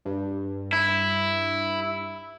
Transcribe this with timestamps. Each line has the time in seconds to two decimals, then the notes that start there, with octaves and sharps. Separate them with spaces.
0.05 G2
0.73 E4